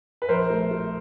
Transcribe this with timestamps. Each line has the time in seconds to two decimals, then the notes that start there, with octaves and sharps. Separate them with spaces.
0.22 B4
0.29 A#1 A#4 C5
0.50 A3
0.71 A3